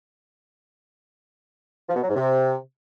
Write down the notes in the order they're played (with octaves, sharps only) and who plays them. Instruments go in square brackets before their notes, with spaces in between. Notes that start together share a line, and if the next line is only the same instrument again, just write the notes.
[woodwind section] F3
B2
F#3
G#2
C3